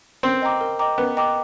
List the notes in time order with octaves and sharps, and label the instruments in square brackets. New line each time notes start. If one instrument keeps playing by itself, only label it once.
[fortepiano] C4 [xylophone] A#4
[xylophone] D#5 G5 A#5 D6
A#4
D#5 G5 A#5 D6
[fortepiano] B3 [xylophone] A#4
[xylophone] D#5 G5 A#5 D6